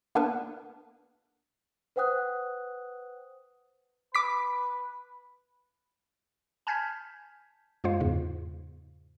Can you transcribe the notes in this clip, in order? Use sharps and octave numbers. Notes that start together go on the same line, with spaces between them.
A#3 B3 D4 A#4 B4
B4 C5 F#5 G5 D#6 F#6
B4 D6 B6
G#5 A5 F6 G6 G#6 B6
F#2 G#3 F4 C5 F5
E2 G#2 C#3